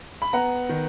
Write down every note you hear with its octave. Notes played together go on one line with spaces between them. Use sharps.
B5
B3 F#5 A#5
D#3